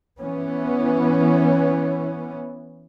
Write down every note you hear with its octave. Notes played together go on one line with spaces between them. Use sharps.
E3 B3 C#4